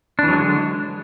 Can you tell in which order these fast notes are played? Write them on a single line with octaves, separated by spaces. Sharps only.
D4 E3 F#3 G#3 D3